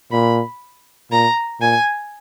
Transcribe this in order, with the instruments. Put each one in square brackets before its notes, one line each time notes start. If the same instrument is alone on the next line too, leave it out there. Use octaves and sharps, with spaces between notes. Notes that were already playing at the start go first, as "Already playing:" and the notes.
[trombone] A#2 [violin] B5
[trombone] A#2 [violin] A#5
[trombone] A#2 [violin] G#5